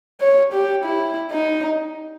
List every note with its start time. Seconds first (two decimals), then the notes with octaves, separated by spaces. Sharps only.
0.21 C#5
0.53 G4
0.84 E4
1.32 D#4